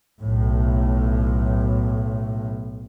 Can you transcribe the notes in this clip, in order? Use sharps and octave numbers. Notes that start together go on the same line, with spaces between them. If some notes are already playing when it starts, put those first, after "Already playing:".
B1 A2